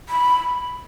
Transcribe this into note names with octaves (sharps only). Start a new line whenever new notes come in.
B5